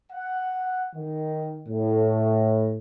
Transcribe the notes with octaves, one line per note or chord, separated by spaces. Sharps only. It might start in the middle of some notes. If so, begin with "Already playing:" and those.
F#5
D#3
A2